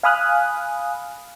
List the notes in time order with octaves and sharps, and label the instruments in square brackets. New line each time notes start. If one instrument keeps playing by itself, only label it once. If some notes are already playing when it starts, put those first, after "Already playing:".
[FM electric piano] F5 G#5 B5 D#6 F6 F#6